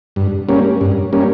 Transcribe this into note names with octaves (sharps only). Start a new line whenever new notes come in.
G2
G3 A#3 C#4
G2
G3 A#3 C#4